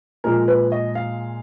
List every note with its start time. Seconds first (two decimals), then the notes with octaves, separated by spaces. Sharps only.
0.24 A#2 F3 G#3 A#4
0.48 B4
0.72 D#5
0.95 F5